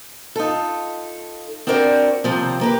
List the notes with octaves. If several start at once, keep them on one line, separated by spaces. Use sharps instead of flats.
D#4 F4 A4
C4 D4 F#4 A#4 C5 D5
D#2 C3 F3 C4
A#3 G4 B4